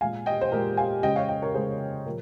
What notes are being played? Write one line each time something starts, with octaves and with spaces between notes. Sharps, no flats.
A#2 G#3 F5 G#5
D#5 G5
C5
A#2 G#3 G4 A#4
F5 G#5
C#3 G#3 D#5 G5
C#5 F5
D#5 G5
A#4 C#5
C#3 G#3 G#4 C5
A#2 F3 A#4